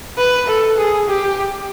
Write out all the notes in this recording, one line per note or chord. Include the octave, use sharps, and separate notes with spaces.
B4
A4
G#4
G4